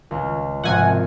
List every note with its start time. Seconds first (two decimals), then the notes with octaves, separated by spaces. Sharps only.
0.11 C#2 C#3
0.64 G#1 F2 C3 F#5 G#5